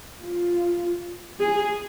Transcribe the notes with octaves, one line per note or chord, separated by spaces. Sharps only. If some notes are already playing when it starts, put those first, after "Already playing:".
F4
G#4